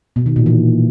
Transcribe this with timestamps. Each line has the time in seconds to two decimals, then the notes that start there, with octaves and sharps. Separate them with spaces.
0.16 B2
0.26 D#3
0.36 A#2
0.46 E3